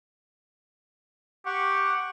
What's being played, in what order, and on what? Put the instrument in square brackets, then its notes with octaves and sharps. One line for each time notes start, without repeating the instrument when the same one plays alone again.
[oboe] G4 [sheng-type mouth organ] F#5 C#6